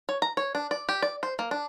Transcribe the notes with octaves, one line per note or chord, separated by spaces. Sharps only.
C#5
A#5
C#5
D4
D5
G4
D5
C5
A#3
D4